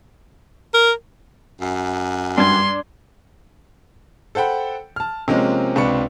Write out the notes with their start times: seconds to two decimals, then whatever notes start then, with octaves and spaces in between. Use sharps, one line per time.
0.74 A#4
1.61 F#2
2.38 G2 D4 C6 G#6
4.35 A4 C5 F#5 G5 B5
4.96 A5 F6
5.28 C3 F3 G#3 A#3 C4 C#4
5.75 C#2 C3 D4 B4 C#6 C#7